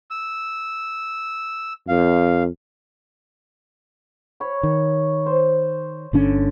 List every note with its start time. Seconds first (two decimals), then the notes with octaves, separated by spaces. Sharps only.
0.11 E6
1.88 F2 F5
4.40 C#5 B5
4.63 D#3
5.26 C5
6.13 G1 D3 C#4